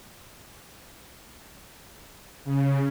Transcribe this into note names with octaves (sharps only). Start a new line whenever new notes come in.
C#3